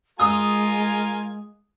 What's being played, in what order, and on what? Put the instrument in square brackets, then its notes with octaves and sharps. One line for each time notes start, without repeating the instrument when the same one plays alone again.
[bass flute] G#3 [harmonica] F4 A#4 G#5 [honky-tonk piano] D#6